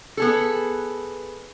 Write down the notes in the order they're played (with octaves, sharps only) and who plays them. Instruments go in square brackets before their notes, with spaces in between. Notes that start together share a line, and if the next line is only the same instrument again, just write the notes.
[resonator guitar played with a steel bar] B3 G#4 A4